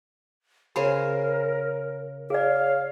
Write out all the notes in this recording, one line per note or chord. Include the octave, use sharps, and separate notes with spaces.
C#3 G#4 A#4 C5 B5
G#4 C#5 D5 F5